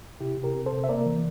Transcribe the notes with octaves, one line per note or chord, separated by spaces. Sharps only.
C3 E4 G4
C3
G4 A#4
C4
A4 C5
C3
E5
A#3 A#4 D5
E3